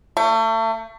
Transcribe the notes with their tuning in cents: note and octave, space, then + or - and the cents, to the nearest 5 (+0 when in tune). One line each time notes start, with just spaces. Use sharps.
A3 +35